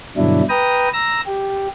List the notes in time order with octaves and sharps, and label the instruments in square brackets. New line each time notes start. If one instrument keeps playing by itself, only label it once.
[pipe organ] G2 B2 D3 F#3 D4 E4
B4 G5 A#5 D#6
A#5 E6 A#6
G4